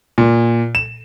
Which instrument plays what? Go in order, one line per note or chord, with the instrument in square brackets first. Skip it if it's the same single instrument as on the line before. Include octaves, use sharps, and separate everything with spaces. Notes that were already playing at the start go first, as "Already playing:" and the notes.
[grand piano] A#2
E7